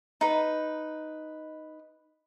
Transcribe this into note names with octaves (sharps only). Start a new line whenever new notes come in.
D#4 B4